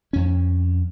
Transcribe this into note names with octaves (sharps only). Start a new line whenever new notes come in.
F2 C#4